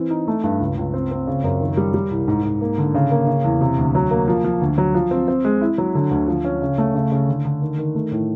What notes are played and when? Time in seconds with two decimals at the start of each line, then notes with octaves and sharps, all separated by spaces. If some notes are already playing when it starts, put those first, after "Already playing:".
Already playing: E3 C4
0.10 D#4
0.28 A3
0.44 G2
0.60 C#2
0.77 C#2
0.94 C4
1.11 C4
1.27 C#3
1.44 F#2
1.61 D#3
1.77 G3
1.94 G3
2.11 C2
2.28 G#2
2.44 G#2
2.61 A#3
2.78 D3
2.95 C#3
3.11 A#3
3.27 C#3
3.44 E2
3.61 C3
3.78 D2
3.95 F#3
4.11 A#3
4.28 F3
4.44 F3
4.62 D2
4.78 F#3
4.94 F3
5.11 C4
5.28 C4
5.45 G#3
5.61 E4
5.78 F#3
5.95 D3
6.11 D2
6.28 F3
6.45 C#4
6.62 C#3
6.78 A3
6.95 C#3
7.12 C#3
7.28 D3
7.45 D3
7.62 D#3
7.78 D#3
7.95 A3
8.12 A2